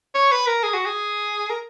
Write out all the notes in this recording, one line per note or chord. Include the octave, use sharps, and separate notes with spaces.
C#5
B4
A#4
G#4
F#4
G#4
A#4